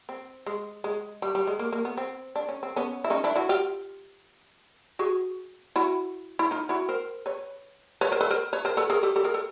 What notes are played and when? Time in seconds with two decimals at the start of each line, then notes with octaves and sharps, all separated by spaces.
0.09 C4
0.46 G#3
0.84 G#3
1.22 G3
1.35 G3
1.47 G#3
1.59 A#3
1.72 A#3
1.85 B3
1.97 C4
2.36 D4
2.49 C#4
2.63 C4
2.76 B3 C#4
3.04 E4
3.10 C#4 D#4
3.24 D4 E4
3.36 E4 F#4
3.49 F4 G4
4.99 F#4 G#4
5.76 E4 F#4
6.39 E4
6.51 D#4 F4
6.69 E4 F#4
6.89 A#4 C5
7.26 B4 C#5
8.01 B4 C#5
8.12 A#4 C5
8.21 A4 B4
8.31 A#4 C5
8.53 B4 C#5
8.65 A#4 C5
8.77 A4 B4
8.90 G#4 A#4
9.03 G4 A4
9.16 G4 A4
9.24 G#4 A#4
9.34 A4 B4